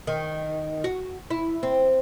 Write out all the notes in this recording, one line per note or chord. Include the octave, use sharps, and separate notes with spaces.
D#3
F#4
E4
C4